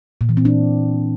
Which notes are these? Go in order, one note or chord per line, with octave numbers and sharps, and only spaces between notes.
A#2
E3
C4
D4